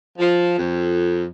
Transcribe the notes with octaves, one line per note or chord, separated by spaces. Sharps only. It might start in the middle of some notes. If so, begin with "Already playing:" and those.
F3
F2